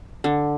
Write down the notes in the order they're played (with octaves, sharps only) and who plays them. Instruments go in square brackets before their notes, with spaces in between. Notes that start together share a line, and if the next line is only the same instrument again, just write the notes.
[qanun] D3